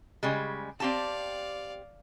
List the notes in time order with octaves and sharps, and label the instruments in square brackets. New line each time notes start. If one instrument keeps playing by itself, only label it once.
[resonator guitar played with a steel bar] C#3 G3 G#3
[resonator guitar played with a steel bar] C4 G4 A5 [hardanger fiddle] D5 F5